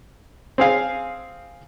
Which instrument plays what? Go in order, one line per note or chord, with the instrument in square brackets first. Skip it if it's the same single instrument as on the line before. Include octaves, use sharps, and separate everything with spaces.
[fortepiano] C4 G#4 F5 G#5